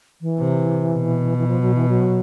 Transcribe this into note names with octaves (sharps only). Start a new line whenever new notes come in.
E3
C3
B2
E3
F3
F#3
E3
F#3